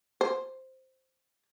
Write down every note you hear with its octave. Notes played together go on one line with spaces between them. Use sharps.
C5